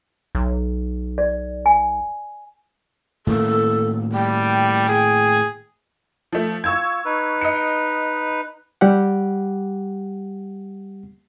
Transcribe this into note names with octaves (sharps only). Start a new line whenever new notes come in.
B1
D5
G#5
A2 D#3 A#3 A4
G3 G5
G#4
F3 A3
F4 C#6 E6 G#6
D#4 B4
D#5 C#7
G3 G4 F#5